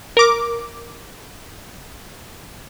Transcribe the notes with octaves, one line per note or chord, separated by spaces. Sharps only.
A#4 D6